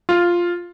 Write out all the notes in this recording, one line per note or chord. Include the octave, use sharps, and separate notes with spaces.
F4